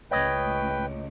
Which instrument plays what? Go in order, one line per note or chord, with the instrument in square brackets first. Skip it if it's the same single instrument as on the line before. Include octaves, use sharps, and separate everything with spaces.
[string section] C#2 A2 [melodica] B4 G5 [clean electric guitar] C#5 D#5